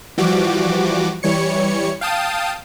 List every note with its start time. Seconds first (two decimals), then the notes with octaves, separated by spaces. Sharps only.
0.18 E3 F3 G3 F#4 D6
1.23 E3 G3 C#5 C#7
2.01 F5 G5 A5 D#6